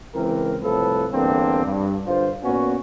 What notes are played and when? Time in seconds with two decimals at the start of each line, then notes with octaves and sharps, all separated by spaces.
0.15 C#2 E3 C4 A#4
0.62 C2 A2 F3 A4 B4
1.12 E2 G2 D3 A#3 C4
1.65 G2
2.07 G2 D3 F4 C5
2.44 A#2 B3 C#4 F#4